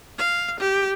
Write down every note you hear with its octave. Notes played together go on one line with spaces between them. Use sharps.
F5
G4